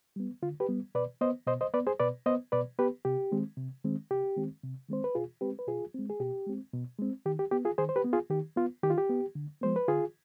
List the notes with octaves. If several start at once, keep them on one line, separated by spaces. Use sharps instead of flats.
G3 B3
D3 F4
G4 B4
G3 B3
B2 B4 D5
B3 C5 D#5
B2 C5 D#5
C5 D#5
B3 B4 D5
G#4 C5
B2 B4 D5
B3 C5 D#5
B2 B4 D5
B3 G4 B4
C3 G4
D#3 G#3 C4
C3
D#3 G#3 C4
C3 G4
D#3 G#3 C4
C3
D#3 G#3 C4 C5
B4
B2 F4 G#4
G#3 C4 G4 B4
B4
B2 F4 G#4
G#3 C4
G#4
B2 G4
G#3 C4
B2
G#3 C4
D#3 G4
G4
B3 G4
F4 G#4
D#3 G#4 C5
C5
G4 B4
B3
F4 G#4
D#3 G4
B3 F4
D#3 G4
F4
G4
B3
D3
F3 G#3 B3 C5
B4
D3 F4 G#4